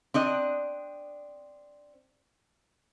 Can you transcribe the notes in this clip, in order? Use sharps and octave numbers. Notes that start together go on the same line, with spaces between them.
C4 D4 D#5